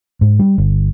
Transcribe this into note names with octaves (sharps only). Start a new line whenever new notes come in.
G#2
G3
G1